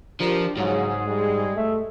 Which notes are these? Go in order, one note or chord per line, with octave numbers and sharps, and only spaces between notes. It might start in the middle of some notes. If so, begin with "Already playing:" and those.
F3 D4 G4 A#4
G#2 C#3 F#3 G#4
G3 G#3
A3 E5